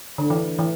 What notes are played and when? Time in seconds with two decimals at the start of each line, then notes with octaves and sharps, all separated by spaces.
0.18 D3
0.30 E3
0.58 E3